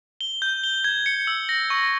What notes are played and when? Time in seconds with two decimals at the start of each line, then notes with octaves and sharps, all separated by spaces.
0.21 G7
0.42 G6
0.64 G7
0.84 G#6
1.06 C#7
1.27 E6
1.49 A#6
1.70 C#6